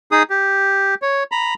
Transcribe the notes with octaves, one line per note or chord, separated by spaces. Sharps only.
D#4 G#4 D#6
G4
C#5
A#5 B5